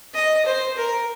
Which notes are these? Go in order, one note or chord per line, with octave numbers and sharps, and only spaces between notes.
D#5
C5
A#4